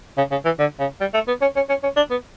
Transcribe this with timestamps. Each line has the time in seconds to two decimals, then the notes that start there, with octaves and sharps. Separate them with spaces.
0.18 C#3
0.31 C#3
0.45 E3
0.59 D3
0.80 C#3
1.01 G3
1.14 A3
1.28 B3
1.42 C#4
1.56 C#4
1.69 C#4
1.83 C#4
1.96 D4
2.11 B3